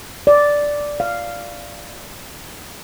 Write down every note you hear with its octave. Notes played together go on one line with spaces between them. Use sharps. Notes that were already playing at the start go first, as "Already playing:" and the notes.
D5
F5